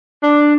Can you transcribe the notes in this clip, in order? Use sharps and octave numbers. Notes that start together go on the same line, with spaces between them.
D4